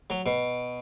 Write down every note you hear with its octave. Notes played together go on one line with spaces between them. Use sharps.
F#3
B2